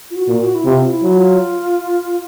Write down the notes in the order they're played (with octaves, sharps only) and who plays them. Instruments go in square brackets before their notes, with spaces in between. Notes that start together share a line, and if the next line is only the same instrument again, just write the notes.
[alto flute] F4
F#4
[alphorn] A#2
[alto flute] F#4
E4
[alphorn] C3 [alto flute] F4
[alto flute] E4
[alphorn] F#3
[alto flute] F4